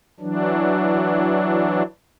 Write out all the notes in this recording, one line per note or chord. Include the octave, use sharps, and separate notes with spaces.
E3 F#3 D4